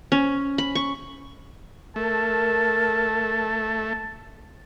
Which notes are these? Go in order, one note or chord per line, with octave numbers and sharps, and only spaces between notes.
C#4
B5
C#6
A3 A#4 A5